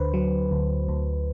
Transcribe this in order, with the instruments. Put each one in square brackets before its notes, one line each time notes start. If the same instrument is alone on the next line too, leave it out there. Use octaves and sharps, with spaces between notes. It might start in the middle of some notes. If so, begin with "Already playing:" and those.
Already playing: [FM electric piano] D2 D3 B4 C5
F#3
D2
D2